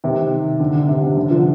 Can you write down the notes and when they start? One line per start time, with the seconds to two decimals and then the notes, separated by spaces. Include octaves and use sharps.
0.04 C3 D#3
0.60 D3
0.75 D3
0.88 C3
1.02 C3
1.17 D3
1.30 D3 F3